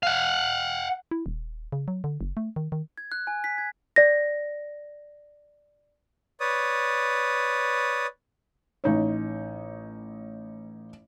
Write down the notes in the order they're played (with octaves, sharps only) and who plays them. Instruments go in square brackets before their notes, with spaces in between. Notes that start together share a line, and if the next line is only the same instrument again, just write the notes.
[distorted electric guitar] F5 F#5
[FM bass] E4
D#1
C#3
F#3
D3
F#1
A3
D#3
D#3
[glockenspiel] G#6
F#6
G#5
B6
G#6
[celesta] D5 A#6
[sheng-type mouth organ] B4 C#5 D5 D#6
[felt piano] A1 D#4 C#5